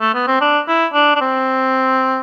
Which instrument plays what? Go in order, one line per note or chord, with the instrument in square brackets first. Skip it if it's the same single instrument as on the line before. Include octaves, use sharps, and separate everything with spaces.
[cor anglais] A3
B3
C4
D4
E4
D4
D4
C4